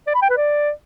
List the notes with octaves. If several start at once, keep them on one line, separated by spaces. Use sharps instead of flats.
D5
B5
G5
B4
D5